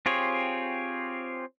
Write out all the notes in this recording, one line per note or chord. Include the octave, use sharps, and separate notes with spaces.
C4 F4 G4 G#4 C#5